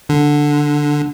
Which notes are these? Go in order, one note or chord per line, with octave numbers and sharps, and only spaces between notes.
D3